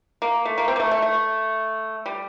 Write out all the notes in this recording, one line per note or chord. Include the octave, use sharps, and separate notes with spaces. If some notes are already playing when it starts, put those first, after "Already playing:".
A#3
A3
A#3
C4
A#3
A3
A3
A3
G3